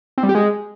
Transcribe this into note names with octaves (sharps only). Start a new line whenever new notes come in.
C4
G3
G4
G#3